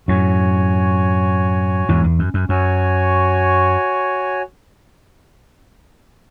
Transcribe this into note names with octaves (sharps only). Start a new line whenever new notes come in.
F#2 A2 F#4 C#5 G#5
E2 G#2
E2
F#2
F#2
F#2 F#4 C#5 G#5